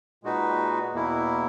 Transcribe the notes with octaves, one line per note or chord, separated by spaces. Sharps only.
A#2 G#3 D#4 F#4 B4
E2 B2 A#3 E4